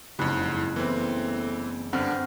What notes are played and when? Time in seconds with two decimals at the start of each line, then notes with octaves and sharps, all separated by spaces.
0.19 F#1 F2 G#2 E4 B5 F#6
0.76 E3 A3 B3 C4
1.93 G2 D3 C4 F#5 G5 F6